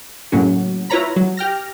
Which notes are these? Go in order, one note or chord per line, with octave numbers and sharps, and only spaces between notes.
A2 C#3 F#3 A#3 C#4 F#4
E4 F4 B4 C#5 A#5 B5
F#3
G4 G5 F6 A#6